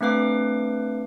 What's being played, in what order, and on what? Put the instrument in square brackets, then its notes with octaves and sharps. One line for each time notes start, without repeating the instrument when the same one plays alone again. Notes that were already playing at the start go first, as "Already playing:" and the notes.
[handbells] A3 C4 D4 B4 F5 D6